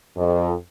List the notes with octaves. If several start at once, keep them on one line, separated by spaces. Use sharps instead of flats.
F2